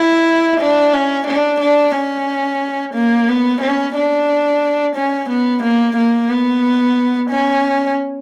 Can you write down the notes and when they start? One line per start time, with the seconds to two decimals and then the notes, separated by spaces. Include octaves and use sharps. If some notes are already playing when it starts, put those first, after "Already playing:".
Already playing: E4
0.60 D4
0.94 C#4
1.27 D4
1.61 D4
1.94 C#4
2.95 A#3
3.28 B3
3.62 C#4
3.96 D4
4.96 C#4
5.30 B3
5.63 A#3
5.97 A#3
6.30 B3
7.31 C#4